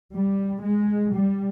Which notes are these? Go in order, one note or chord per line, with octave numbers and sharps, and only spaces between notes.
G3
G#3
G3